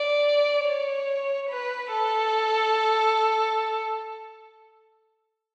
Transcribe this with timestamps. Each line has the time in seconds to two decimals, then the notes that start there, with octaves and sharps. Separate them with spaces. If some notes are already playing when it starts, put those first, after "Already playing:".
Already playing: D5
0.65 C#5
1.49 B4
1.91 A4